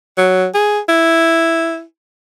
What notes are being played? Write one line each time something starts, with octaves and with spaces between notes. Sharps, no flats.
F#3
G#4
E4